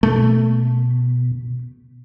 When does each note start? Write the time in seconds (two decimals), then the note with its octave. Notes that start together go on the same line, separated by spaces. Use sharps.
0.03 B2 A3